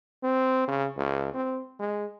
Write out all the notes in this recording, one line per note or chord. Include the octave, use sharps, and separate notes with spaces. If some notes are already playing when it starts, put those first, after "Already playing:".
C4
C#3
C#2
C4
G#3